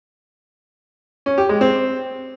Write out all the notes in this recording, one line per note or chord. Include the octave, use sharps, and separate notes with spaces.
C#4
G4
G#3
C4